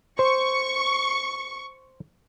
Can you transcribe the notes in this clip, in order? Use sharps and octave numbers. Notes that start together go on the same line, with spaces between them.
C5 C#6